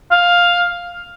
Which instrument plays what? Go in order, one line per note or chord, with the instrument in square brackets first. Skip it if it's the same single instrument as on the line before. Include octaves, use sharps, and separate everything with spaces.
[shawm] F5